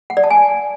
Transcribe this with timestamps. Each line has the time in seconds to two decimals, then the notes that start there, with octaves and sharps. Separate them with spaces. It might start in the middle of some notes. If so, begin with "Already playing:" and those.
0.10 F#5
0.17 D5
0.24 A5
0.30 G#5